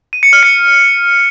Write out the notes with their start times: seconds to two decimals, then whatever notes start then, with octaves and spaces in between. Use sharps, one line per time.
0.13 D#7
0.23 C#7
0.33 F6
0.43 C#7